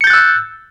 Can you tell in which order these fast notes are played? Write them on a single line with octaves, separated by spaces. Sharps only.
C#7 G6 A6 F#6 E6